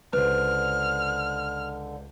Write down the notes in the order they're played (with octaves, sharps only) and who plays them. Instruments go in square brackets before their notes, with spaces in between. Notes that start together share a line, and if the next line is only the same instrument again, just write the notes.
[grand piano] C#2 C5 [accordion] D3 [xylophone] B4 [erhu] F6